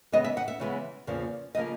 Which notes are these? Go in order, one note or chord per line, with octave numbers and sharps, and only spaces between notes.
C#3 E3 G#3 B3 D#5
E5
F#5
E5
C#3 E3 G#3 B3
E2 C#3 F3 A#3
C#3 F3 A#3 D#5